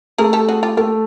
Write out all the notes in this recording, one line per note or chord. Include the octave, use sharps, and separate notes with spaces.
A3 G#4 A#4
G4 A4
F#4 G#4
F4 G4
A3 F4 G4